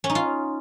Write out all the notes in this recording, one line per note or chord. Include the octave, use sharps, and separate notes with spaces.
C#4
D#4
F4